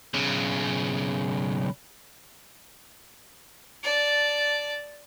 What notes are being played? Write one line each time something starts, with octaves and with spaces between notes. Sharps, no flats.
B1 C#3
D5 A5